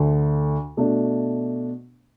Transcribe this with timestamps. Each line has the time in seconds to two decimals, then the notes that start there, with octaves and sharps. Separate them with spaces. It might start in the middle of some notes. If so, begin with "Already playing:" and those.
Already playing: D2 D3 A3
0.77 B2 A3 D4